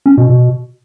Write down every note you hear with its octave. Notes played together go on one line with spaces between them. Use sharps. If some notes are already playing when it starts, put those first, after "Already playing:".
C#4
B2
B2